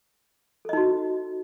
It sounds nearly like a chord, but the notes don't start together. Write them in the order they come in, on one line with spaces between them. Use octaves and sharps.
A4 D#5 D#4 F#4